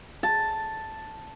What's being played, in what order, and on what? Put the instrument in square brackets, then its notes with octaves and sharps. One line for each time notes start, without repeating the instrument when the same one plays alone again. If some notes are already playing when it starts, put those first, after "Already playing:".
[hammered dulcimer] A5